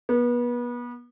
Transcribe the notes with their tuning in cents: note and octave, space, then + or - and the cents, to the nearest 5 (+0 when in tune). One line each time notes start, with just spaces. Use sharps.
B3 -30